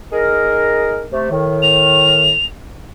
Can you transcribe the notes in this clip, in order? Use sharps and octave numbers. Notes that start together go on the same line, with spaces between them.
D#4 G#4 A#4
C3 A3
A2 D#3
F7